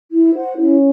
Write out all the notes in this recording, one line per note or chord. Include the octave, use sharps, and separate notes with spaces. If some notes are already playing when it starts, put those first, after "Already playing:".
E4
C5 F#5
C#4 E4